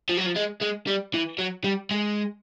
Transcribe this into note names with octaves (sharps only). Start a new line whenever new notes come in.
F3
F#3
F3
G#3
G#3
G3
E3
F#3
G3
G#3